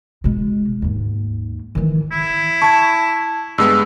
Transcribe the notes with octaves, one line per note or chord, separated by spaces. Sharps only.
B2 G#3
D#2 G#2
D#3 E3
E4
A5 C#6 G#6
G2 G#3 B3 E6